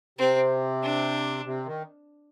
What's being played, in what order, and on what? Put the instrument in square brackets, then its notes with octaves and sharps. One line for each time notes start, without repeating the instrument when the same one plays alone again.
[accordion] C3 [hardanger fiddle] C4
[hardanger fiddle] D4
[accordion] C3
D#3